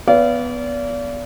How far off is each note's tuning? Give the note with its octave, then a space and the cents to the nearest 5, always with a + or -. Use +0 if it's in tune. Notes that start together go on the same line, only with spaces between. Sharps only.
B3 +0 D5 -35 F5 -25